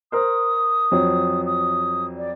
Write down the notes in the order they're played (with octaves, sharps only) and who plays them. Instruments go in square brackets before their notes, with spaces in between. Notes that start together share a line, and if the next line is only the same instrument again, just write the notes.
[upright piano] A#4 C5 [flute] D#6
[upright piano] F2 F#3
[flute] D#6
D5